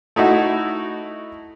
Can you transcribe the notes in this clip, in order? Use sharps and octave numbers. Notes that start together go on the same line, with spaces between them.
A3 D#4 E4 F#4